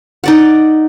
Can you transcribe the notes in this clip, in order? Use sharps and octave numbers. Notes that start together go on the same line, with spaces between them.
D#4 D5 F#5